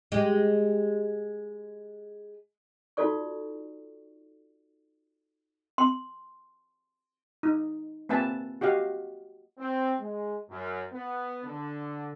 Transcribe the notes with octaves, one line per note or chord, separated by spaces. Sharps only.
G#3 G4
D#4 F4 F#4 A4 D5 C#6
C6
D#4
A#3 C4 B4 E5 G#5 A5
F#4 G4 D#5 F5
C4
G#3
F#2
B3
D3